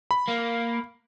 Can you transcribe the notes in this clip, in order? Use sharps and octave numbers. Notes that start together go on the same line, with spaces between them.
B5
A#3